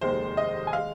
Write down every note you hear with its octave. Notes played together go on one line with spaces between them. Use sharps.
F1 D#2 D#3 G#3 C5
D#5
G#5
G#3 F5